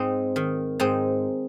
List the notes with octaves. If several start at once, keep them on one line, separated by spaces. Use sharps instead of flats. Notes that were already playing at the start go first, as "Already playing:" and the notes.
Already playing: G#2 C4 D#4
D#3
G#2 C4 D#4